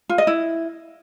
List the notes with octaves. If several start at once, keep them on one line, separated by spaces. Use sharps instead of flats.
F4
D#5
E4